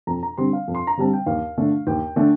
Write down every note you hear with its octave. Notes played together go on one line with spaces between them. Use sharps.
F2 A#5
A#5
D3 G3 C4 C6
F5
F2
C6
A#5
D3 G3 C4 A5
G5
D#2 F5
D3 A3 D4
D#2 G5
D3 A3 D4